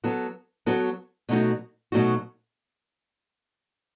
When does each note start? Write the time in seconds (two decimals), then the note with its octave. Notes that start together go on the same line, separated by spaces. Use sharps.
0.04 F#3 B3 F#4 A4
0.66 F#3 B3 F#4 A4
1.29 B2 F#3 A3 D#4 F#4
1.92 B2 F#3 A3 D#4 F#4